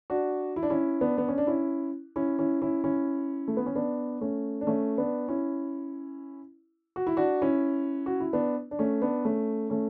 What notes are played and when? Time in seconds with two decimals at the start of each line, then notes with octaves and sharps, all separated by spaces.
0.10 D4 F#4
0.56 E4
0.63 D4
0.70 C#4 E4
1.01 B3 D4
1.18 B3
1.28 C#4
1.38 D4
1.47 C#4 E4
2.16 C#4 E4
2.39 C#4 E4
2.62 C#4 E4
2.84 C#4 E4
3.48 A3
3.57 B3
3.66 C#4
3.75 B3 D4
4.21 A3 C#4
4.61 D4
4.67 A3 C#4
4.98 B3 D4
5.29 C#4 E4
6.96 F#4
7.07 E4
7.17 D4 F#4
7.42 C#4 E4
8.06 F#4
8.20 E4
8.33 B3 D4
8.71 D4
8.79 A3 C#4
9.01 B3 D4
9.25 A3 C#4
9.70 A3 C#4